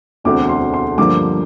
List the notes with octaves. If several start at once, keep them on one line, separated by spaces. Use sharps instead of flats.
E1 D2 D3 A3 C4 D6
C6
C6
G2 D3 F3 A#3 D6